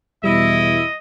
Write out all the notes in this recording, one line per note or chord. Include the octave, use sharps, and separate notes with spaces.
E2 B2 G3 E4 D#5